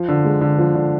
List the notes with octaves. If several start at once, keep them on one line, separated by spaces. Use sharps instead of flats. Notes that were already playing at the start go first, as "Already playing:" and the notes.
Already playing: F3
D3
G#3
D3
F3
D3